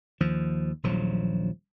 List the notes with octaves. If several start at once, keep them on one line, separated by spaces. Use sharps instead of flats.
D#2 F3
D#1 A#1 F3 F#3